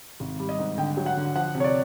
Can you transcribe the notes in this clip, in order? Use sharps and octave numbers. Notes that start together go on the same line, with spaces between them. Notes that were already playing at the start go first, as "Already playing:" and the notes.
G#1
G3
D#5
G#2
D3 G5
F#3
F#5
D3
F3 F#5
C3
C#5
D5